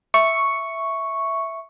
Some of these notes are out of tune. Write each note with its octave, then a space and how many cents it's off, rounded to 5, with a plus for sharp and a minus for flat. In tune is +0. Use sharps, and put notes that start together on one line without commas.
E5 +0 C#6 +0